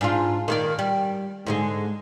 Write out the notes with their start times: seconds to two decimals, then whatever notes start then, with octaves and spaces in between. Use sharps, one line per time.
0.01 G#2 D4 F4
0.48 D#3 A#3 D5
0.79 G3
1.46 G#2 D3 G#3